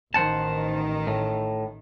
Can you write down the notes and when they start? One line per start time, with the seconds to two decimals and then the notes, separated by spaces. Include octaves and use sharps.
0.14 A1 D#3 C5 F#5 A5
1.07 A2